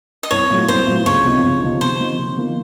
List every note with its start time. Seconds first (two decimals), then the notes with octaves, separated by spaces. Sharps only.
0.23 D#5
0.31 C2 C#5
0.50 A#2 F#3 A3
0.68 C2 C5
0.86 A#2 F#3 A3
1.06 C#2 C#5
1.24 C3 F3 C4 D#4
1.43 C#2
1.62 C3 F3 C4 D#4
1.81 C3 C5
2.00 F3 A#3 D#4
2.18 C3
2.37 F3 A#3 D#4